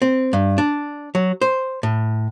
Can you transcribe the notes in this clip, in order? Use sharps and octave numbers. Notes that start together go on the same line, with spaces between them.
C4
G2
D4
F#3
C5
A2